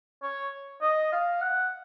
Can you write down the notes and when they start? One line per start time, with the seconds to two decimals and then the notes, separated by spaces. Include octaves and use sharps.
0.23 C#5
0.82 D#5
1.12 F5
1.41 F#5